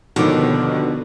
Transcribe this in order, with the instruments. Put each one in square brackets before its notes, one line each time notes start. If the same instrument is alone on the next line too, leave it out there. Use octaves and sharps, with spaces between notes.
[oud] D#2 D3 [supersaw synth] B2 [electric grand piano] D#3 F3 D6